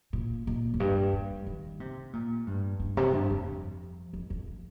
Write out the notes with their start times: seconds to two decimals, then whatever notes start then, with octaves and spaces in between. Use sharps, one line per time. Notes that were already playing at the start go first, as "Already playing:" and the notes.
0.13 A#2
0.47 A#2
0.74 F2
0.80 G2
1.13 G2
1.47 D#3
1.80 C3
2.13 A#2
2.47 G2
2.80 G2
2.97 C3
3.13 G2
3.30 F2
4.13 F2
4.30 F2